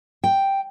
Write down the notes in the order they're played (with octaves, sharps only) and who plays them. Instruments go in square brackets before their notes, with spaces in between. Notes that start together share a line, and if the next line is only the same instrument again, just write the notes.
[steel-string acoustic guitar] G5